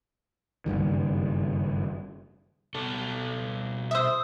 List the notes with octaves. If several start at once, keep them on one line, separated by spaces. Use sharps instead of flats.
F#1 C2 G2 D#3
B2 A4
C5 E5 D#6 E6